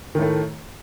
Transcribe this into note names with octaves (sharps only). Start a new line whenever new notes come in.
A2 D#3 A3